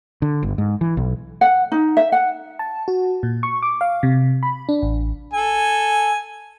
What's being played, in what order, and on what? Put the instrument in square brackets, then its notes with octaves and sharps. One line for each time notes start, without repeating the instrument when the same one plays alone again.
[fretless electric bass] D3
G1
G#2
E3
B1
[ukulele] F#5
D#4
E5
F#5
[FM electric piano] A5
F#4
A#2
C#6
D6
F5
C3
B5
D4
A1
[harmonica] A4 G#5